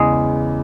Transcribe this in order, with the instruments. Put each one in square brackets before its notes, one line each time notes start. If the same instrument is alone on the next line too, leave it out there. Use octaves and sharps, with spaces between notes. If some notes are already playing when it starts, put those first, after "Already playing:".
Already playing: [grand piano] E2 C#3 E3 [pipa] G#3